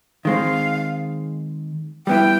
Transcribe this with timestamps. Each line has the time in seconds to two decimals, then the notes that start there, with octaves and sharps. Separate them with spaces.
0.25 D#3 G#3 C4 F5
2.07 G3 B3 E4 G5